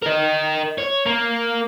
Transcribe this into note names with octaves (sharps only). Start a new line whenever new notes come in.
A#4 D#5
C#5
A#3